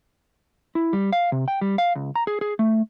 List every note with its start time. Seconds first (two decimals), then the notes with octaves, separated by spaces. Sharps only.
0.75 E4
0.93 G3
1.13 F5
1.32 C3
1.48 G5
1.61 G3
1.78 F5
1.95 C#2
2.16 A#5
2.27 G#4
2.41 G#4
2.59 A3